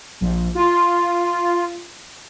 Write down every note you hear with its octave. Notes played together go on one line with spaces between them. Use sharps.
A#1
F4